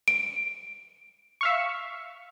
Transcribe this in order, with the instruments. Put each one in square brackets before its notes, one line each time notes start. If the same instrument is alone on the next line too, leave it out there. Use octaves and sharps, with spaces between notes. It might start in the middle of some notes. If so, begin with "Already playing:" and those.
[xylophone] D7
[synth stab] E5 F5 C#6